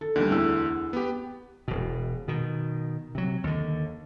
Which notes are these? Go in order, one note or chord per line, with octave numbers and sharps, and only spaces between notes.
A4
D2 D3 D#3 G3
E2 E6
B3 G4
E1 B2
B2 D#3
C3 F#3
D#2 D3